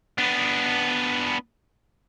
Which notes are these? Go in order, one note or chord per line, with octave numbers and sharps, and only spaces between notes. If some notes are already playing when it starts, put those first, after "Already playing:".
B3 D4